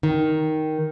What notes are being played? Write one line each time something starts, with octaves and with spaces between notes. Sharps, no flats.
D#3